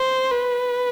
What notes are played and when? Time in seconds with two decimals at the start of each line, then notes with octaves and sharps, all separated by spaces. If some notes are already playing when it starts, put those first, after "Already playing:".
Already playing: C5
0.31 B4